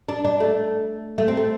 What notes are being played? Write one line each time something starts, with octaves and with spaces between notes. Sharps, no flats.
D4
D4
A3
A3
C4
A3